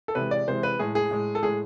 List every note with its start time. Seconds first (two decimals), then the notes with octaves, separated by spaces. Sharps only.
0.08 A4
0.15 C3 E3 G#3 B4
0.31 D5
0.47 C3 E3 G#3 C5
0.63 B4
0.79 A2 G#3 G#4
0.95 G#4
1.11 A2 G#3
1.35 A4
1.42 A2 G#3 G#4